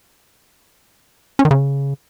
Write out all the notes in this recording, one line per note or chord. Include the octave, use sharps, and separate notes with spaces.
C#4
D#3
C#3